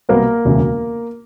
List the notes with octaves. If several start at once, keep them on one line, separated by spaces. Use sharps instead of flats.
C2 B2 G3 A#3 B3 A#4
E1 D2 C#3